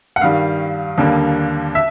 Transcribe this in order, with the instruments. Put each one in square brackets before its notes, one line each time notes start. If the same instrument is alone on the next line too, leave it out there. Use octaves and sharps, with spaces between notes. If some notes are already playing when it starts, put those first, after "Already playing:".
[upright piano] F#5
G2 D#3 G3 F5
D#2 D3 G3 A#3
E5